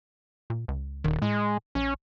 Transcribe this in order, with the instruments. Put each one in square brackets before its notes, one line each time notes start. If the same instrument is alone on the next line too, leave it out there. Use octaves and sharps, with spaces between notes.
[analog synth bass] A#2
C#2
[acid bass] D#1 [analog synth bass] D#3
[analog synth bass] A2 [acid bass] G#3
[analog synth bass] A#1 [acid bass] C#4